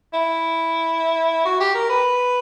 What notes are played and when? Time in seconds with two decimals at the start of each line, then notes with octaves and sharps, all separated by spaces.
0.13 E4
1.45 F#4
1.60 G4
1.75 A#4
1.89 B4